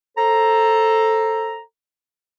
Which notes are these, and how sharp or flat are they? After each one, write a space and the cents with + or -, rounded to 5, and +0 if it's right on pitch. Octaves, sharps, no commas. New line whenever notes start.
A4 +5 C5 +20 A#5 +0